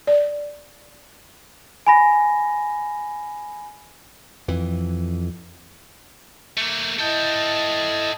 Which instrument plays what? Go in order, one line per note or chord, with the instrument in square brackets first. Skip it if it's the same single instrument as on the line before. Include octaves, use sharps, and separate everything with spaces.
[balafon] D5
[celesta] G#5 B5 A#6
[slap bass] F2 E3
[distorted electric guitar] A3 A#3
[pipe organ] E4 D#5 A5 [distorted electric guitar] A4 G5